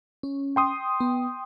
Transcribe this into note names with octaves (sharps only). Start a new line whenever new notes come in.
C#4
G5 C6 D#6
B3